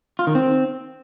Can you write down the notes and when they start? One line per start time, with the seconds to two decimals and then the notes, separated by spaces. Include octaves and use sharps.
0.19 F4
0.27 D#3
0.35 C4